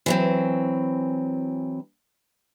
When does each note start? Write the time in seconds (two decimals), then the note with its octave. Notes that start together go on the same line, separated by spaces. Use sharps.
0.06 E3 F#3 C4